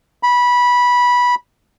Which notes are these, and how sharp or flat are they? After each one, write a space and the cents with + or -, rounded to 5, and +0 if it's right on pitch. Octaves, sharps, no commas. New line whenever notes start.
B5 -15